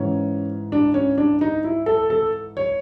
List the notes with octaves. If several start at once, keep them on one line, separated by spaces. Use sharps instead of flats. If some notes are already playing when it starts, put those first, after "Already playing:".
Already playing: G#2 E3 C#4
D4
C#4
D4
D#4
E4
A4
A4
C#5